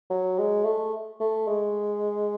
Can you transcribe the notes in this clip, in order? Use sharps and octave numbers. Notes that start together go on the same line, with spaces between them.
F#3
G#3
A3
A3
G#3